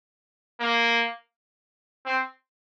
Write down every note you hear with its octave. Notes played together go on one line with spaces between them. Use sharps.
A#3
C4